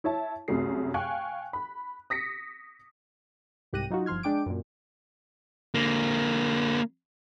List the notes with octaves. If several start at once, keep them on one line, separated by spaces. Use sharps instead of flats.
E4 C#5 E5 A5
C2 F#2 A3 G#4 C7
F5 G5 G#5 C#6 F#6
B5
D#6 A#6 B6 C#7
C2 G#2 G4 F#6 A#6 D#7
F#3 D#4 F4 F#4
G1 F3 C6 F6 G#6
G#3 D4 G5 D6 D7
F#2 A#2
D3 A#3